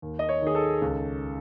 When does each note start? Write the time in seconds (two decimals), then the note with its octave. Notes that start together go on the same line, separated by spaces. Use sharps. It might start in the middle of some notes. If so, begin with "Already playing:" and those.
0.02 D#2
0.19 D#5
0.29 C#5
0.42 D#3 G#4
0.55 A4
0.82 C#2